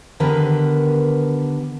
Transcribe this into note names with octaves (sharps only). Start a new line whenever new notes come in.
D3 D#3 B3 G4 A#4 B4